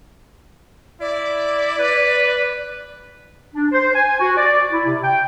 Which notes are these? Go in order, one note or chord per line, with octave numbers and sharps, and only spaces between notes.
E4 D5
B4
D4
C5
G#5
F#4
D5
E4
C3
G5